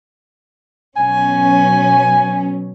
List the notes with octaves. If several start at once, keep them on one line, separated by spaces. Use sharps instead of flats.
B2 F#3 C#4 G#5